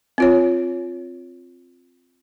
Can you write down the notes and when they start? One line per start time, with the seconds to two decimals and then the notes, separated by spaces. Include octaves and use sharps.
0.18 C4 F4 C#5